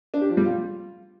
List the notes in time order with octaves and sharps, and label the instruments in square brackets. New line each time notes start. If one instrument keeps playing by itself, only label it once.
[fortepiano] D4
G4
F3
G3
F4